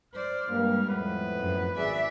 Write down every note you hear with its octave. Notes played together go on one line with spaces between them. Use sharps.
C5 D5 F6
G2 G3 G#3 A#3
F2 A2 B3 B4
F#2
G#1 G#4 D5 E5